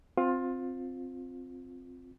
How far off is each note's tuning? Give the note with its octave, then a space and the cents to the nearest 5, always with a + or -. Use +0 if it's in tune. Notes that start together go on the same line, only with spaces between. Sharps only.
C4 +0 F4 +20